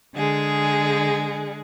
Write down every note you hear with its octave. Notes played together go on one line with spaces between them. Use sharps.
D3 G#3 G#4